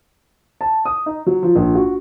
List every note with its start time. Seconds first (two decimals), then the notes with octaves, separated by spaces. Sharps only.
0.61 A5
0.85 D#6
1.06 D#4
1.26 F#3
1.43 F3
1.56 A#1
1.75 F#4